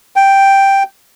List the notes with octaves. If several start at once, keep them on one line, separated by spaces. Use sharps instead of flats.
G5